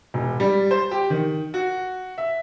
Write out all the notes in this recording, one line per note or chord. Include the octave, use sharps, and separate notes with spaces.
E1
G3
C5
G4
D#3
F#4
E5